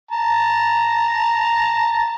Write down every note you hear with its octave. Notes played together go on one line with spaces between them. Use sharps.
A5 A#5